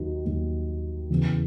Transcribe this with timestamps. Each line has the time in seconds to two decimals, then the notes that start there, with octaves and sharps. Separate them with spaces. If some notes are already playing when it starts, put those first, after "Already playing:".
Already playing: D#2 D#3 F#3
0.25 D#2 D#3 F#3
1.10 E2 C#3 E3